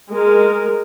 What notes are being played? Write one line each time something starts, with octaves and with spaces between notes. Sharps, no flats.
G#3 A#4